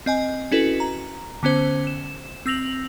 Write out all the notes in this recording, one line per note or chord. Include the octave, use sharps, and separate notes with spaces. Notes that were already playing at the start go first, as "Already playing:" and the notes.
C4 D#5 G#5
C#4 E4 F#4 A4 B4
A#5
D3 B3 C#4 C5
E7
C4 E6 A#6 F7 F#7